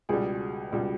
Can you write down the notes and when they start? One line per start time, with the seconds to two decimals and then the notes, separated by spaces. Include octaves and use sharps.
0.09 C#2 B2 G3 G#4
0.72 C#2 B2 G3